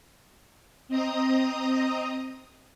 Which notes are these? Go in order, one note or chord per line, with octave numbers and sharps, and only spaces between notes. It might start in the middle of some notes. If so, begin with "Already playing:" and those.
C4 D#5 A#5 D#6